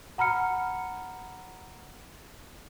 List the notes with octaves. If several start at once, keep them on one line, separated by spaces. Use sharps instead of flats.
F#5 A#5 B5 F6 C#7